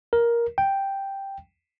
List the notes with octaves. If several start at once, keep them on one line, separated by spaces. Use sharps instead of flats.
A#4
G5